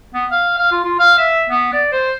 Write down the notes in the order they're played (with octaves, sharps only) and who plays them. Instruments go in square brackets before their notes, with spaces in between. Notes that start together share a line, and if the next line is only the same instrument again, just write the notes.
[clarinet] B3
F5
F5
F4
F4
F5
E5
B3
D5
C5